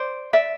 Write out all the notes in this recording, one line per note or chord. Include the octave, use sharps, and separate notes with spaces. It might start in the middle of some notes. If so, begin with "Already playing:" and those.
Already playing: C5 D5
D5 E5